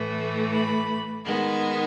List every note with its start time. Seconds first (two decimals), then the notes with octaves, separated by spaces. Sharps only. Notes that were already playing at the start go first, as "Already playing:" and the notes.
Already playing: A2 E3 A3
0.52 B5
1.24 D#3 G#3 B3